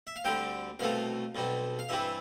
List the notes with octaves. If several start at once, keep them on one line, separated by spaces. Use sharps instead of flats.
E5
F5
D2 D3 G3 C4 G5
C2 B2 A3 C4 F5
B1 B2 G3 C4
F5
G2 E3 G3 C4 E5